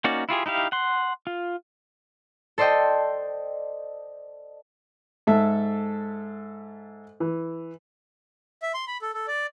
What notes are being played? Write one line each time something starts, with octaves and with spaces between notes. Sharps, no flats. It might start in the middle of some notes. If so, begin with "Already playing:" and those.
A#3 C#4 D#4 F#4 D5
E4 F4 G4 G#4
D#4 E4 G4 F5
F#5 C6
F4
A4 C5 D5 D#5 G5
G#2 A4 E5
E3
E5
C6
B5
A4
A4
D5